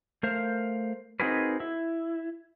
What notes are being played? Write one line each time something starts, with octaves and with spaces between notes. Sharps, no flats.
A3 A#4 C5 F5
C4 D#4 F#4 G#4 A#4 B4
E4